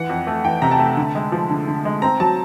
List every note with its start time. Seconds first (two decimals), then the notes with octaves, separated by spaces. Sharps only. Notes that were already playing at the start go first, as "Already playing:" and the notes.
Already playing: E3 F#5
0.09 F2
0.27 A3
0.44 E3 G5
0.62 C3 A#5
0.71 A5
0.79 A3
0.97 D3
1.15 G#3
1.32 F3
1.50 D3
1.67 D3
1.85 G#3
2.02 C4 A#5
2.20 F#3 A5